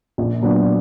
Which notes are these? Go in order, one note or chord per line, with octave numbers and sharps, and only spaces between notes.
A#1
A#2 F#3 B3 D4